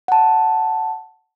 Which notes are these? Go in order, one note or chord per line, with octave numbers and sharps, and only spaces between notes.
F#5 A5